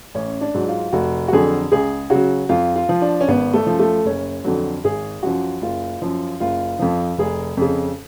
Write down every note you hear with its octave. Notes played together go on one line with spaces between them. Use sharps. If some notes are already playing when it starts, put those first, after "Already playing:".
A1 C#4
D4
G#2 F#3
F4
F1 F#4
F#4
F2 D3 F#3 G#4
C#2 G#4
C#3 F#4
F#3
F2 F4
F4
F3
D4
C#4
G#1 B3
A3
F#2 F3
A3
F#1 C#4
F2 D3 F#3
G#1 G#4
F#2 F3 F#4
F#1 F4
F#2 F3
F#1 F4
F2 F3
F1 G#4
F2 C#3